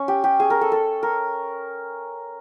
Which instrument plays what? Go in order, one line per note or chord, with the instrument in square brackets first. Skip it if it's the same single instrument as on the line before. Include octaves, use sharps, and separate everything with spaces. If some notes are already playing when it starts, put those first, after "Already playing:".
Already playing: [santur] C#4
G4
G4
G#4
A#4
A4
A4
A#4